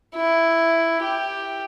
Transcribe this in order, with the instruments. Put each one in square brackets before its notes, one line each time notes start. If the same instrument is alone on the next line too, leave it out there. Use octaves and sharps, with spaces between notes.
[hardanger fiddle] E4
G4